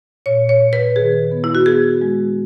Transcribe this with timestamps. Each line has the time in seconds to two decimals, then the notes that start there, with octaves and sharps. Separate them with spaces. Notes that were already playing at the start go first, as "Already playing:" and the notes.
0.26 A#2 C#5
0.49 C#5
0.61 A#2
0.73 B4
0.96 D#3 G#4
1.31 B3
1.44 E4
1.55 F#4
1.66 B3 G#4
2.01 G#3